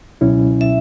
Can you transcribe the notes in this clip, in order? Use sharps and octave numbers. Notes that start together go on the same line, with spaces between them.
C#2 B2 F#3 C#4 E4
E5